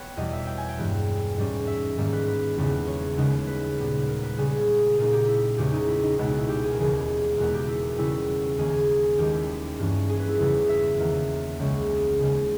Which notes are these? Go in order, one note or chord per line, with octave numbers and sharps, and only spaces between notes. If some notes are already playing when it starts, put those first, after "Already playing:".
Already playing: B3 B4 C#5 G5
E2 B2 G3 D#5
E5
G5
G#5
G5
G2 E3 G#3 B3
G#2 G3 C#4
E5
G#2 D#3 G3 A#3
B4
B4
E2 C#3 G3 B3
C#5
D#2 C#3 G#3 B3 D#4
B4
A#2 G3 B3
A#4
B4
C#3 G3 C#4 G#4
A#2 A#3 D#4 G#4
G4
E4
E2 C#3 G#3 C#4 G4
D#4
E4
D#4
C#2 B2 G#3 B3 D#4
D#4
E4
G4
G#4
A#4
D#2 C#3 E3 G#4
E2 B2 G#3 B3 A#4
G4
E4
C#3 G3 C#4 E4
D#2 D#3 A#3 C#4 G#4
D#2 D#3 G#3 G4
E4
G2 E3 A#3 C#4
G#4
B4
E4
E2 C#3 E3 G3 E4
C#5
E5
E2 D#3 A#3
C#2 C#3 G#3 C#4
D#2 C#3 G#3